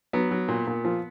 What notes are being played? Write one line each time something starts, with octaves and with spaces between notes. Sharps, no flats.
F#3 B3
F#3
A#2
A#2
F3